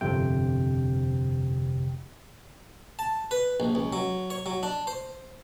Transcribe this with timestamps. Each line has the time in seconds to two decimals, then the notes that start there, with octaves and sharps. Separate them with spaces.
0.01 G1 F2 C3 G5
2.99 A5
3.31 B4
3.60 A#1
3.75 C#2
3.93 F#3
4.30 C#5
4.46 F#3
4.63 D4
4.87 C5